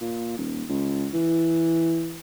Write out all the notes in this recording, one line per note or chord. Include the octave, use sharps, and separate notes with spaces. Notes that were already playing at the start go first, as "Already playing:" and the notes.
A#2
D#1
C#2
E3